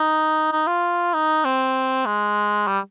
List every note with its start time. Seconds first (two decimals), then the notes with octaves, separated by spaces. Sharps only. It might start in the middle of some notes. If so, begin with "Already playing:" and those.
Already playing: D#4
0.52 D#4
0.67 F4
1.14 D#4
1.44 C4
2.06 G#3
2.68 G3